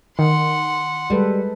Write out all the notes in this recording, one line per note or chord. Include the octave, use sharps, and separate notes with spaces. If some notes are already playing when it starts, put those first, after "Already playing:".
D#3 F#5 C6
G3 G#3 A4 B4